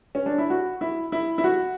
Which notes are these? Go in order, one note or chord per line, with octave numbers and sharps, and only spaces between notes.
C#4
D4
E4
F#4
E4
E4
E4
F#4